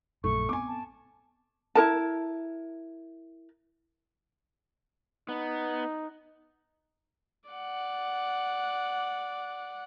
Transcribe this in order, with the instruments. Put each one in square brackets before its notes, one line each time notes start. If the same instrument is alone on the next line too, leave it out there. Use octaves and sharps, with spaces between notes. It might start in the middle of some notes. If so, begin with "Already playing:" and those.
[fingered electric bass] A#1 F#2 [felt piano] A3 [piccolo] C#6
[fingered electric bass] B3 C4 [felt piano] G#5 D6
[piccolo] A5
[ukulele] E4 A#4 A5
[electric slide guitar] B3 [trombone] D#4
[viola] D5 F#5